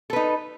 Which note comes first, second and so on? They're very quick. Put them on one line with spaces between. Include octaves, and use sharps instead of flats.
A4 B4 D#4